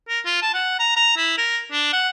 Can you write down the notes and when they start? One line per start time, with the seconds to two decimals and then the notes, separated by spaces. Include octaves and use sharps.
0.08 A#4
0.26 F4
0.42 A5
0.54 F#5
0.79 A#5
0.96 A#5
1.17 E4
1.38 A#4
1.72 D4
1.93 F#5